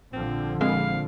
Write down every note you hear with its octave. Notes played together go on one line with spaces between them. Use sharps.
A#1 D3 F3 C4
G#3 C4 F5